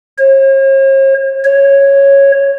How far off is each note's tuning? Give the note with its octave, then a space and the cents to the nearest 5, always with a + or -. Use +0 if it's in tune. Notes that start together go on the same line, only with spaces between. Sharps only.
C#5 -45
C#5 -5